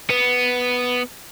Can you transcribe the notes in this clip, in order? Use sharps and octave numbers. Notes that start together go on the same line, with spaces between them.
B3